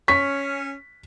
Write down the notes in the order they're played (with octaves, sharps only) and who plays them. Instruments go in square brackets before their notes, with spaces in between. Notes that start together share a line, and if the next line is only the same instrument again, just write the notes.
[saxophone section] C#4 [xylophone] C#6 [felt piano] B6